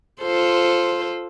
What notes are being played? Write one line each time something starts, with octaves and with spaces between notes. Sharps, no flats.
F4 A4 C5